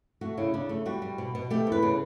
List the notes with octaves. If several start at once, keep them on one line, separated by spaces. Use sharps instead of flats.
A3 F#4
C#3 E4
C#3 D4
A3
G3 F#4
G3
B2
B2
A3 G4
E2
B4
C#3